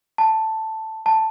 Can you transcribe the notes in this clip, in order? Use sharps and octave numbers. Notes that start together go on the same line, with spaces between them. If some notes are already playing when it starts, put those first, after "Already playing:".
A5
A5